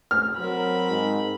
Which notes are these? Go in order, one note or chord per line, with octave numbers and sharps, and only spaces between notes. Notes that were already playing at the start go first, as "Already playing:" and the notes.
F6
F#3 C4 A#4 B5
G#2